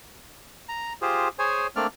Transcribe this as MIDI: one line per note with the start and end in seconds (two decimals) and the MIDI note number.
0.69 0.93 82
1.02 1.28 65
1.02 1.28 67
1.02 1.28 68
1.02 1.28 72
1.39 1.67 68
1.39 1.67 72
1.39 1.67 73
1.39 1.67 80
1.76 1.87 57
1.76 1.87 58
1.76 1.87 60
1.76 1.87 62
1.76 1.87 74
1.76 1.87 89